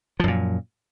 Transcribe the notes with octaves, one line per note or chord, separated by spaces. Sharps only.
F#2 A#2 F3